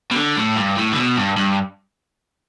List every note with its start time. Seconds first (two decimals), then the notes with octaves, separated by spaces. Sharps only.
0.11 B2
0.16 D3
0.37 A2
0.56 G2
0.77 A2
0.92 D3
0.96 B2
1.17 G2
1.37 G2